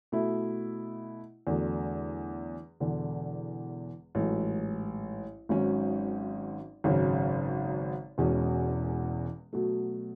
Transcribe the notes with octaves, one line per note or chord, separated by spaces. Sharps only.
B2 A3 E4
E2 D3 F#3 A3 D4
E1 E2 D3
A1 G#2 F#3 A3
G#1 G#2 F#3 C#4
G#1 F#2 C#3 F#3
E1 E2 B2 G#3 C#4
B2 F#3 A3